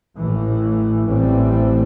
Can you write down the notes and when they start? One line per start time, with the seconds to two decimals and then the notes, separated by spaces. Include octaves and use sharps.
0.16 A1 A2 E3
1.06 A1 A2 E3 G3 C4